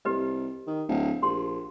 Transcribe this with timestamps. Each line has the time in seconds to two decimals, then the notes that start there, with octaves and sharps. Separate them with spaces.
0.05 C2 G4 B4 D#5
0.67 D#3
0.88 D1
1.22 A#1 G4 C6